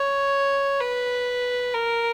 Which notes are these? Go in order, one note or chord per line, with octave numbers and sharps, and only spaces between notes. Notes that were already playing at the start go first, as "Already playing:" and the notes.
Already playing: C#5
B4
A#4